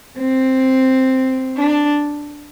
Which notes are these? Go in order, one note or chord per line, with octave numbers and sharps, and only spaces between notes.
C4
D4